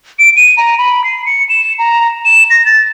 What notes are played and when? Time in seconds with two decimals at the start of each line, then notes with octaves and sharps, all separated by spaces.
0.19 D7
0.36 D#7
0.57 A#5
0.78 B5
1.04 C7
1.26 C#7
1.49 E7
1.78 A#5
2.25 E7
2.50 A#6
2.66 A6